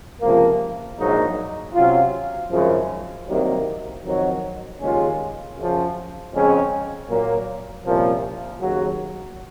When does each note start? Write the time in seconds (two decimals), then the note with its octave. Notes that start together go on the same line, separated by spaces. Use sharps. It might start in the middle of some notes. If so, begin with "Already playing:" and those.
0.21 C#2 C3 F3 A#3
0.98 A#1 G#2 F#3 A#3 D#4
1.74 C3 F#3 C#4 F4
2.50 G#1 F#2 C#3 F3 G#3
3.27 C2 C3 D#3 F#3 A#3
4.04 F2 D#3 F#3
4.80 D#2 C#3 G#3 C#4 F4
5.56 F#2 C#3 F3
6.32 F2 C#3 G#3 C#4
7.09 A#2 F#3 A#3
7.85 C2 A#2 F3 A#3 C#4
8.61 D#2 C#3 F#3